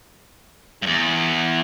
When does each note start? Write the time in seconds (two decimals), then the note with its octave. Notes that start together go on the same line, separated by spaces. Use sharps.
0.82 E2 G2